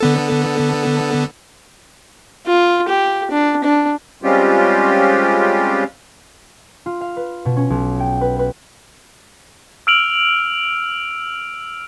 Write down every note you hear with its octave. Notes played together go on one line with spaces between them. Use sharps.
D3 B3 A4
F4
G4
D4
D4
G3 G#3 C4 C#4 F4 G4
F4
F5
B4
B2
C#4
B1
G5
B4
B4
E6 F6 D7 F7 F#7